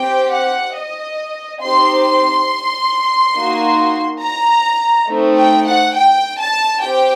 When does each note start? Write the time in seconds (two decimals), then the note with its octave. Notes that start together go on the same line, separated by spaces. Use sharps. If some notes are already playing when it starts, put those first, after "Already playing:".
Already playing: C4 G4 G5
0.32 F#5
0.75 D#5
1.62 C4 D#4 G4 C6
2.06 C6
3.35 A#3 D#4 F#4
4.22 A#5
5.08 A3 C4 D#4
5.38 G5
5.66 F#5
5.96 G5
6.39 A5
6.81 C4 G4 G5